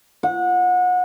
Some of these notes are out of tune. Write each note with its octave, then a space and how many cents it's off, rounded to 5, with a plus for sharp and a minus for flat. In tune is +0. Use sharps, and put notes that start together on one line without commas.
F#5 -30